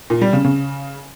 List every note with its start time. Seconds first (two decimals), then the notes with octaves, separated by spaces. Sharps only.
0.10 A#2
0.22 G3
0.33 C#3
0.45 C#3